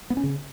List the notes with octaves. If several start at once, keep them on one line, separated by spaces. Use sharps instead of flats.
B3
C#4
C#3